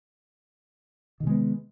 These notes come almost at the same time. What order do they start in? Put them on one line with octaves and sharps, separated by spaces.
D#3 C3 G#3 B3